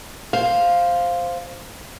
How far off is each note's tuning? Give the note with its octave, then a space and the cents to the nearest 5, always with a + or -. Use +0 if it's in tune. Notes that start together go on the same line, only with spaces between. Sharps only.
C5 +0 F5 +0